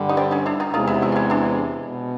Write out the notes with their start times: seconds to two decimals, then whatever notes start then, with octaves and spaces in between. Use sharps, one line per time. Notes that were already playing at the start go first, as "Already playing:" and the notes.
Already playing: G2 D3 G3
0.09 D#4
0.17 C4 D4
0.31 C#4 D#4
0.46 D4 E4
0.60 D#4 F4
0.74 E2 C3 E3 G#3 D#4 F4
0.87 E4 F#4
1.02 E4 F#4
1.12 F4
1.16 E4 F#4
1.30 D4 E4
1.87 B2